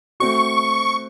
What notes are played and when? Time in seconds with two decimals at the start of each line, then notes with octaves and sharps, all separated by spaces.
0.20 A3 C4 F#4 C#6